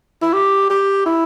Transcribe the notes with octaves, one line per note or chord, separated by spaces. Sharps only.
E4
G4
G4
E4